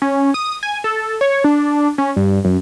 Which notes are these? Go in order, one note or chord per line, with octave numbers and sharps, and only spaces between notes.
C#4
D#6
G#5
A4
C#5
D4
C#4
G2
F#2